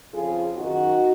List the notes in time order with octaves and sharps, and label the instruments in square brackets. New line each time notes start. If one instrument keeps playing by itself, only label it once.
[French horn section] F2 C#3 F4 G#4
F#2 D#3 D#4 F#4